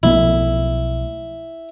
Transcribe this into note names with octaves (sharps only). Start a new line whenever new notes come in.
B1 F3 A3 E4